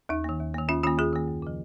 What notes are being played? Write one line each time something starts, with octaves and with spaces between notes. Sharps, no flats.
D#2 D#4
D#3 A#3
D#2
D#3 A#3
D#2 C#4 F4
D#3 A#3 C#4 F4
D#2 F4 G#4
D#3 A#3
F#2
C#3 F3